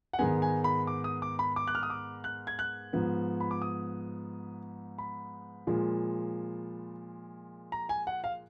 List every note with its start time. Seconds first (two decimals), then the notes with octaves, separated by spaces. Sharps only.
0.13 F#5
0.19 G#2 D#3 G#3 B3 G#5
0.42 G#5
0.64 B5
0.87 D6
1.04 D#6
1.22 D6
1.39 B5
1.56 D6
1.67 F#6
1.75 F6
1.83 D#6
1.90 D6
2.24 F#6
2.47 G#6
2.59 F#6
2.93 G#2 F3 B3
3.40 B5
3.51 D6
3.62 D#6
4.98 B5
5.67 A#2 F3 G#3
7.72 A#5
7.89 G#5
8.07 F#5
8.24 F5